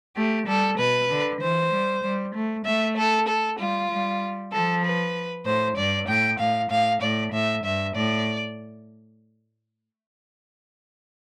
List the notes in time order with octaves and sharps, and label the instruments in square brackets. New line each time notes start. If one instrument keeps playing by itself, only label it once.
[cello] A3 [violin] G4
[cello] G3 [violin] A4
[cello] B2 [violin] B4
[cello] D3
[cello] E3 [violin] C5
[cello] G3
G3
A3
[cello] A3 [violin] E5
[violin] A4
A4
[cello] G3 [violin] F4
[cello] G3
[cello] F3 [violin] A4
[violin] B4
[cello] A2 [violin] C5
[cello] G2 [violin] D5
[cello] A2 [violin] G5
[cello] A2 [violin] F5
[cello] A2 [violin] F5
[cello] A2 [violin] D5
[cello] A2 [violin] E5
[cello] G2 [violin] E5
[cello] A2 [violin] D5